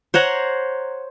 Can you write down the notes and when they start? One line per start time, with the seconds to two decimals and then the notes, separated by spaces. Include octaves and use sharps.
0.14 C5 C#5 F#5 A#5